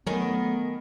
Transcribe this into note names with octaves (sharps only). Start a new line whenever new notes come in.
D#3 F#3 A3 B3 A#4 G#5